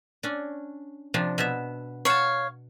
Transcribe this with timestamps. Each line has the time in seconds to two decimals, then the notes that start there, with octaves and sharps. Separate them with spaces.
0.23 C#4 D4
1.14 C3 F3 D4
1.38 B2 B3 E5
2.05 C#5 F5 F#5 A5